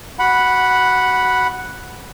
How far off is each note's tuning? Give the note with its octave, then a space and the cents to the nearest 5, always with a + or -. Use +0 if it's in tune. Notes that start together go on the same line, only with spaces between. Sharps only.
F#4 +20 F#5 +0 B5 -5